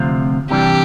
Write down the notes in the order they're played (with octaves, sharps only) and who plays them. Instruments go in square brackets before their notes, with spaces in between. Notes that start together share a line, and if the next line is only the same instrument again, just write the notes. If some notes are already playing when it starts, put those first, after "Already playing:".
Already playing: [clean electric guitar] D2 C3 F3 C4 F4
[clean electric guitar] C3 E3 G3 D4 [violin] G4